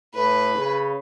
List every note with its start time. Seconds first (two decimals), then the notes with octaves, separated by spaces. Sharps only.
0.14 A2 B4
0.55 C#3